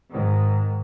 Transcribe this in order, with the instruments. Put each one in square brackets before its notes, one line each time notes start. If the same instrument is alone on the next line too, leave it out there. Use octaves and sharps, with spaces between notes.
[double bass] G#2 D#3